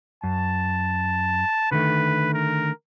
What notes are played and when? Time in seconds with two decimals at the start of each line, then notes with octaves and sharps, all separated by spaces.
0.24 F#2 A5
1.71 D3 D#3 A3 B4
2.34 A#4